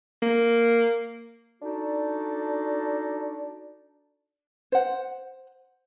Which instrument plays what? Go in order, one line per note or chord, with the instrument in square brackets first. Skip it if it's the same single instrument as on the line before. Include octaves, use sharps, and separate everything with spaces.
[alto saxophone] A#3
[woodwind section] D4 D#4 F#4 A4 D5
[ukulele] C5 F#5